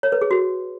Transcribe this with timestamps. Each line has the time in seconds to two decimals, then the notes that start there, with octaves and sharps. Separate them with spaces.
0.03 C#5
0.12 B4
0.21 G#4
0.31 F#4